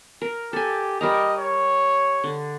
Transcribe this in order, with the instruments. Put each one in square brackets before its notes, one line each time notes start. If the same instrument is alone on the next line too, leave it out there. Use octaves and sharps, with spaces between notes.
[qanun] A#4
[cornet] G4 [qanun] A4 G#5
[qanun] G3 A#4 A#5 [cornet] D#5
[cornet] C#5
[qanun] D3